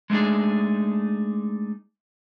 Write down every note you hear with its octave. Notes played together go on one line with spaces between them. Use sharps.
G#3 A3 D4 D#4 G#4